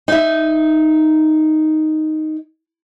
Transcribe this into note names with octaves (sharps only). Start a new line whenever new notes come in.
D#4 E5